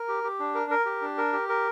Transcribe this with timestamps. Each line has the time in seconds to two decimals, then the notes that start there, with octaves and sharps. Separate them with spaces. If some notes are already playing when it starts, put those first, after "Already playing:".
Already playing: A#4
0.08 G4
0.24 G4
0.40 D4
0.55 A#4
0.71 A#4
0.86 G4
1.02 D4
1.18 A#4
1.33 G4
1.49 A#4